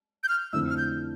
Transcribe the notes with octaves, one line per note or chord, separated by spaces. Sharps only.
G6
F6
F2 D3 A3 E4 E6
F6
G6